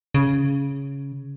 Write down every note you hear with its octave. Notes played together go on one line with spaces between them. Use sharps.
C#3